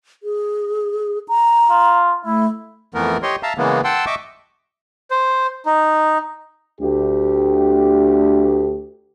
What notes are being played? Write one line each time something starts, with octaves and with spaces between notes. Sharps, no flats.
G#4
A#5
F4
A3 E4
F2 E3 A3 B3 A#4
G4 C#5 D#5 C6
E5 F5 A5 A#5
C#3 E3 G#3 A#3 B3
F#5 G5 A5 C6 E6
D#5 E5 C#6 D6
C5
D#4
D2 G4